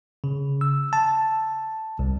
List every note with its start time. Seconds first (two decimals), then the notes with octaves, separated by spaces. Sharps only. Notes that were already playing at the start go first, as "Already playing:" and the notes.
0.24 C#3
0.61 E6
0.93 A5
1.99 C2